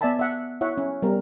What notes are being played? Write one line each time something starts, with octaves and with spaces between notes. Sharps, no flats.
B3 D5 E5 G#5 A5 B5
E5 F#5
E4 C#5 E5 F#5
C#4
G3 B3 A#4